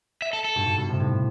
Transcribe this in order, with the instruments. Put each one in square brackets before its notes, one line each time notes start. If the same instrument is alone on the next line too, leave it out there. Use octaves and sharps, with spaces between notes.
[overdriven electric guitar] E5
A4
A4
[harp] G2 B2
G2 B2
G2 B2
A2 C3
A2 C3